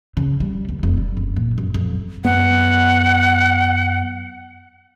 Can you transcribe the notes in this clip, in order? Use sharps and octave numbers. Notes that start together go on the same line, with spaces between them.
C#3
G3
D#2
F1
G3
F#1
A#2
F#2
F2
F#2 B3 F#5